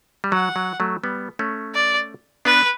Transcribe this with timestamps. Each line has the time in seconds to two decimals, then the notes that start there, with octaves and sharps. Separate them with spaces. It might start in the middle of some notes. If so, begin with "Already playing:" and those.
0.24 G3
0.32 F#3 F#5
0.56 F#3
0.80 F#3 A3
1.04 G3 B3
1.39 A3 C#4
1.75 D5
2.45 B3 D4 B4